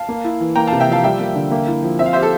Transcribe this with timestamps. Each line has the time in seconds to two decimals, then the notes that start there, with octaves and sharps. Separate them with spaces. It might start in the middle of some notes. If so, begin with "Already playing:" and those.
Already playing: F5 A5
0.09 A#3
0.24 E4
0.40 E3
0.55 A#3 G5 A#5
0.67 C3 F5 A5
0.80 E5 G5
0.88 F3 F5 A5
1.03 G3 E5 G5
1.20 A#3
1.36 D3
1.51 A#3
1.67 E4
1.83 F3
1.99 C4 E5
2.06 F5
2.13 G4 C5 E5
2.23 A4